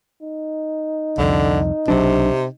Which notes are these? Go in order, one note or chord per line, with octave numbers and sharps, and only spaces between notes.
D#4
C2 F2 D3
B1 C3 F#3 D4